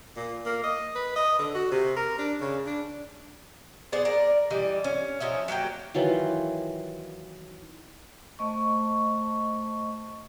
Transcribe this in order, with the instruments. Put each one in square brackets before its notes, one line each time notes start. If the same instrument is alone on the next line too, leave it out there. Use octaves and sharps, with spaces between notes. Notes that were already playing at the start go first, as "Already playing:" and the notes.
[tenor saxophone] A#2
A#3
D#5
B4
D#5
D3
F#4
C3
A#4
D4
C#3
D4
[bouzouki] B3 G#4 C5 D5
A#4 D5
E3 G3 D#5
C#4
F3 C#4 D#4 E5
F#3 A#3 G4 G5
[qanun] D#3 E3 F#3 F4
[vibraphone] A3 C5 D#5 A5 C#6